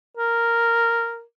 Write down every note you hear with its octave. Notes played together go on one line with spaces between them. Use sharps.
A#4